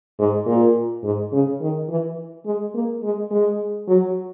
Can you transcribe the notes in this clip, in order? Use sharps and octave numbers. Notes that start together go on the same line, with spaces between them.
G#2
A#2
G#2
C#3
D#3
E3
G#3
A#3
G#3
G#3
F#3